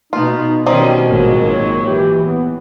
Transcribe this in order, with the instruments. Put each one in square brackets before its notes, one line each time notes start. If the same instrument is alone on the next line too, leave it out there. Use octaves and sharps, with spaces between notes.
[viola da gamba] B2 B3 [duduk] D#4 [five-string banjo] F4
[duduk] B2 [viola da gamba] D#3 G3 C#4 [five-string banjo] C4 D#4 D5
[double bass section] G#1 D#3 A#3 [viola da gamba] A#2 F#3 G#3
[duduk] C#5
[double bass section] E3 [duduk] G4
[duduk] B3